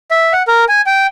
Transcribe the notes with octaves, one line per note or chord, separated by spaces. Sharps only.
E5
F#5
A#4
G#5
G5